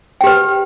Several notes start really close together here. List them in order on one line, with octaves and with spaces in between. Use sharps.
G5 G4 B4